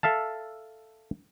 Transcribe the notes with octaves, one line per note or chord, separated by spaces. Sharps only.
A4 E5 F5 A5